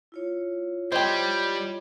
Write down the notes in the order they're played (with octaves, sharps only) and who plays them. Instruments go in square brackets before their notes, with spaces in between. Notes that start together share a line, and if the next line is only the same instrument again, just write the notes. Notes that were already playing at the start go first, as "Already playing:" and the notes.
[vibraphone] E4 F4 C#5
[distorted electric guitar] G3 [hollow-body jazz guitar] C5 G5 [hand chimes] D#5 C6 G#6